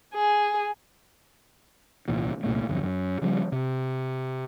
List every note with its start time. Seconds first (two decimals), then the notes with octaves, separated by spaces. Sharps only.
0.13 G#4
2.08 D#1 C2 A#2 E3
2.43 C2 A#2 A3
2.67 D1 G1 F2
2.83 F#2
3.21 C#3 F3 G3
3.52 C3